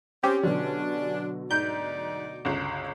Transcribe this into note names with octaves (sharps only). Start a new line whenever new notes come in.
C4 C#4 G4
B2 D3 F#3 D4
D2 G#2 D#4 D5 G6
G1 C#2